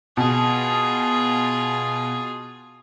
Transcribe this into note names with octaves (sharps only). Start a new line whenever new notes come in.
B2 F4 G#4